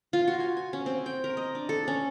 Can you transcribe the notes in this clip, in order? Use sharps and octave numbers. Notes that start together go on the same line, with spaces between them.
F4
F#4
G#5
G#5
C#4
C4
G5
A#4
D#5
D4
A4
C#4